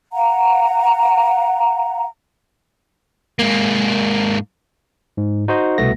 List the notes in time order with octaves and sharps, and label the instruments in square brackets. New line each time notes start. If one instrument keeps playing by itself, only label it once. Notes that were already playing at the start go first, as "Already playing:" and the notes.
[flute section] F5 F#5 A#5
[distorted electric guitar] G#2 A#3
[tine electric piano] G#2
D#4 F#4 C5 D#5
C2 B2 A3 B3 A#6